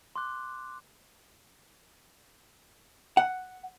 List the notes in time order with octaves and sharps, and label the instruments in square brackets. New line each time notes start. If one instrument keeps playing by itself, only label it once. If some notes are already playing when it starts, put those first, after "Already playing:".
[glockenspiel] C6 D6 F#6
[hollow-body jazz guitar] F#5